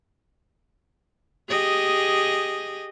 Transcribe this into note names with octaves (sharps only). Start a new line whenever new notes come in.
G4 G#4 D#5